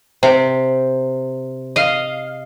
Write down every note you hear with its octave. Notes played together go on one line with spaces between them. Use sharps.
C3
D#5 F5